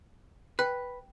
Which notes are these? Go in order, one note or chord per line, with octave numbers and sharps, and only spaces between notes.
B4 G5 F#6